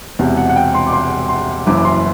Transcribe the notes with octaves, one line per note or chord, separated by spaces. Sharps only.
E1 E2 C3
F#5
F#5
G5
C6
D6
C6
C6
F#1 F#2 E3 D6
D6
C6